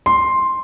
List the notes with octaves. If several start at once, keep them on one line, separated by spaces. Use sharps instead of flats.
C6